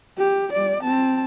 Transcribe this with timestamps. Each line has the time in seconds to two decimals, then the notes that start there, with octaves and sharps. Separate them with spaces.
0.18 G4
0.53 G3 D5
0.82 C4 A5